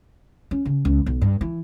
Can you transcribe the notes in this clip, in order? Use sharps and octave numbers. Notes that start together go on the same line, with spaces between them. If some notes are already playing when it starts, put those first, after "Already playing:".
C#4
C#3
C#2
B1
G2
E3